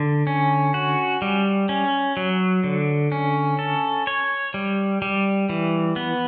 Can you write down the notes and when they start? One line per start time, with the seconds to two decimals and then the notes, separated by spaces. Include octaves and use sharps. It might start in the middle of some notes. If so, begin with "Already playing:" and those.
Already playing: D3
0.27 C#4
0.74 F#4
1.22 G3
1.69 C#4
2.17 F#3
2.64 D3
3.12 C#4
3.59 A4
4.07 C#5
4.54 G3
5.02 G3
5.49 E3
5.96 B3